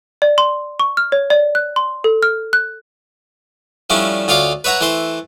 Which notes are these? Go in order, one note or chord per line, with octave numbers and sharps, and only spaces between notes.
D5
C6
C#6
F6
C#5
D5
F#6
C6
A4
F6
F#6
F3 G3 A3 C#4 D4 E4
D2 F4 C#5 D5 F5 D6
B4 C#5 E5 F#5 A#5
E3 A3 C5 C6